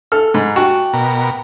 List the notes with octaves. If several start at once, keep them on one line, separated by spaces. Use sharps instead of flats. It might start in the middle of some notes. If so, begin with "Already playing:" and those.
A4 F6
G#2 A#5 B5
F#4 G4 A5
B2 A#4